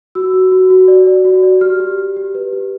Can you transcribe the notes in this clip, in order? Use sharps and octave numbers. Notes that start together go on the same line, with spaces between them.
F#4 E6
F#4
F#4
F#4
D5
D5
F#4
D5
G4 F6
G4
G4
G4
B4
G4